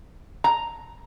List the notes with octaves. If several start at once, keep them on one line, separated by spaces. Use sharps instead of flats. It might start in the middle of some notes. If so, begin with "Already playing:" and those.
A#5